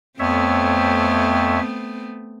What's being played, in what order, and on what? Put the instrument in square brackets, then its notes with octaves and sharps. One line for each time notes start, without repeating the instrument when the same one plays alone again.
[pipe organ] F2 C#5 E5 [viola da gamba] A3 B3 C4